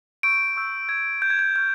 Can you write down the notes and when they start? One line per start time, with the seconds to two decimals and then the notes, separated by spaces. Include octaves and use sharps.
0.23 C#6 E6 G6 D7
0.56 C#6 E6 G6
0.89 C#6 E6 G6 G#6
1.22 C#6 E6 G6
1.30 G#6
1.39 G6
1.56 C#6 F6 G6